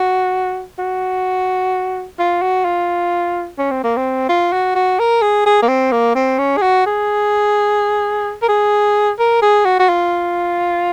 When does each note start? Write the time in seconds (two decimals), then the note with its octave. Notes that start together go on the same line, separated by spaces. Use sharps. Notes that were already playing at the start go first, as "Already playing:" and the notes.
Already playing: F#4
0.79 F#4
2.19 F4
2.42 F#4
2.65 F4
3.58 C#4
3.71 C4
3.84 A#3
3.97 C4
4.29 F4
4.53 F#4
4.75 F#4
4.99 A#4
5.22 G#4
5.46 G#4
5.62 A#3
5.68 C4
5.92 A#3
6.15 C4
6.38 C#4
6.57 G#4
6.62 F#4
6.86 G#4
8.42 A#4
8.48 G#4
9.19 A#4
9.42 G#4
9.65 F#4
9.80 F#4
9.89 F4